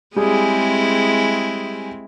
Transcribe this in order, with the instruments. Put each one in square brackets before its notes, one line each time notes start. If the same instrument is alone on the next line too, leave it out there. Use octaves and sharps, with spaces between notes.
[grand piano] G3 G#4 [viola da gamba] G#3 C4 E4